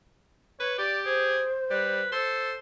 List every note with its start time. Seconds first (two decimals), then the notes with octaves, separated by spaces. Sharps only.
0.60 B4 C#5
0.78 G4 D5
1.05 G#4 C5
1.70 G3 B4
2.12 A4 C5